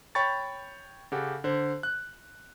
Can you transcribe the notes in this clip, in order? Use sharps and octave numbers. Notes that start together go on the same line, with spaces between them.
C#5 G5 B5 C#6 A6
C#3 G4 A4 F#5
D3 C5
F#6